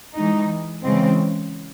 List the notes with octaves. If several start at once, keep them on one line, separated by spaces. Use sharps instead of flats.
E3 G#3 D#4
C#3 E3 G#3 C4